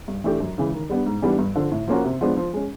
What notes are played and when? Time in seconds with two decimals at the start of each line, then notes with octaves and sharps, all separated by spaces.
0.08 G2
0.24 E3 A3 D4 G4
0.40 F#2
0.58 C#3 E3 G#3
0.74 D#3
0.89 G3 B3 D4
1.06 G#2
1.22 E3 G3 B3 D4
1.39 G2
1.55 D3 F3
1.72 A2
1.88 F3 A#3 C#4 F#4
2.04 C3
2.21 F3 G#3 B3 D4
2.37 F3
2.53 G#3 C#4